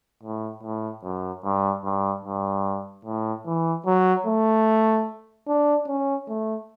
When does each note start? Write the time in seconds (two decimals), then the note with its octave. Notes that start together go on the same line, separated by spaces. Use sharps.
0.23 A2
0.63 A2
1.04 F#2
1.44 G2
1.84 G2
2.25 G2
3.05 A2
3.46 E3
3.86 F#3
4.26 A3
5.47 D4
5.88 C#4
6.28 A3